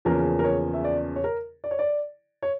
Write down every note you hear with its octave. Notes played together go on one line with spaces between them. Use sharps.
E2 C#3 F3 A#3 C#4 A#4
A#4
C#5
E5
D5
C#5
A#4
D5
C#5
D5
C#5